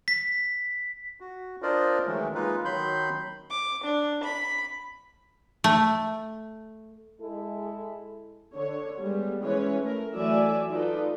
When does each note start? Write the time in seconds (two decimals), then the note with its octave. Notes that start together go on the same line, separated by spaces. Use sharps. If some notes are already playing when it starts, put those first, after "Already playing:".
0.08 B6
1.20 F#4
1.62 D4 F4 A#4 C5 D5 D#5
2.06 D#3 E3 F#3 G#3 A3
2.35 G#3 A#3 D#4 F4 B4
2.65 D#3 F#3 B5 C6 G6
3.50 D6
3.85 D4
4.24 B5
5.64 A3
7.20 G#3 E4 A4
8.53 D3 C#5
9.00 G3 G#3 B3
9.42 E3 G#3 C#4 B4 C#5
9.81 A3 A#4
10.13 E3 F#3 A3 D5 E5 G#5
10.70 D#4 F4 A4 B4 D5